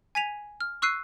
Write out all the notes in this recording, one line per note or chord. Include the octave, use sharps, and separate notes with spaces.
G#5 G#6 B6 D#7 F7
F6
C#6 E6 F#6 C7 D#7